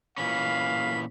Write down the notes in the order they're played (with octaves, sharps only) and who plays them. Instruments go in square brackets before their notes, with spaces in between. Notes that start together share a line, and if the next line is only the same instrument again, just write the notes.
[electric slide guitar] A#2 E3 C#4 [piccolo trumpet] F5 [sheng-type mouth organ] B5